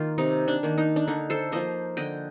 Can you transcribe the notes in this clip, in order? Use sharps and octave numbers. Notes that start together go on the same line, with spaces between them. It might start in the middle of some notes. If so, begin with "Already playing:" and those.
Already playing: D#3 A#3 F4
C3 D#4
D4
D#3 A#3
D#4
D4
D3 D#4
A4 C5
F3 A#3 C5 D#5
D3 D#5 G5